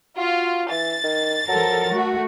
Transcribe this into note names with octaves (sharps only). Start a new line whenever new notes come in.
F4 F#4
E3 A6
D#3
F3 F#3 A4 A#4
A3 F#4